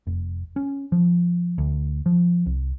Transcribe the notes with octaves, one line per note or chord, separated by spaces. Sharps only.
F1
C#4
F3
D2
F3
C2